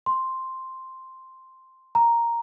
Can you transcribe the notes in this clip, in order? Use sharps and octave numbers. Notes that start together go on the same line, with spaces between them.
C6
A#5